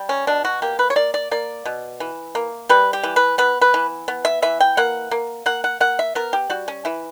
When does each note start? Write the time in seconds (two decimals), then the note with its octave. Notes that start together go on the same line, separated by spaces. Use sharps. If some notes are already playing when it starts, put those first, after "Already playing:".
Already playing: G3
0.09 C#4
0.27 B2 D4
0.45 F#4
0.62 A#3 G4
0.79 B4
0.90 C#5
0.96 A#3 D5
1.14 D5
1.31 A#3 D5
1.66 B2
2.00 E3
2.35 A#3
2.69 G3 B4
2.93 G4
3.03 E3
3.16 B4
3.38 B3 B4
3.61 B4
3.74 E3
4.08 B3
4.25 E5
4.42 E3 E5
4.60 G5
4.77 A#3 F#5
5.11 A#3
5.46 A#3 F#5
5.64 F#5
5.80 A#3 F#5
5.99 E5
6.15 B3 A#4
6.33 G4
6.50 G3 F#4
6.68 C#4
6.85 E3 E4